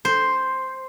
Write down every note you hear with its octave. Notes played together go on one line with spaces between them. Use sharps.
C5